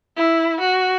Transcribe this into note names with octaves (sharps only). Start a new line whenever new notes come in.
E4
F#4